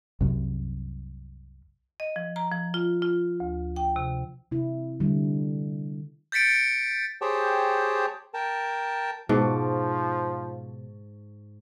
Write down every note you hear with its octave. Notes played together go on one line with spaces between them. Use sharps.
C2 F#2 C3
D#5
F3
A#5
F3
F4
F4
D2
G5
C3
C3 E4
D3 G3
G6 A6 B6 C#7 D7
G4 G#4 C5 C#5 G5 A5
A#4 G5 A5
G#2 B2 F3 A5 C#6 D6